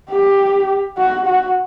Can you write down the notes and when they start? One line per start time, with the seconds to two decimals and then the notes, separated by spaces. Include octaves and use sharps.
0.10 G4
0.98 F#4
1.26 F#4